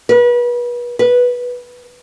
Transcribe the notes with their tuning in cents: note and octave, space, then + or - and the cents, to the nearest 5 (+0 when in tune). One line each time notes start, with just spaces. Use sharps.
B4 -35
B4 -10